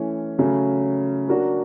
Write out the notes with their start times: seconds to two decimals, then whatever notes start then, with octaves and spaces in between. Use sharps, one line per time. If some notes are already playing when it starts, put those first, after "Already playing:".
Already playing: E3 A3 C#4 E4
0.39 C#3 F#3 A3 C#4
1.28 F#3 A#3 D4 F#4